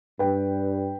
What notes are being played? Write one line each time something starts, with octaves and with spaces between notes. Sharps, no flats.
G2 B4 G5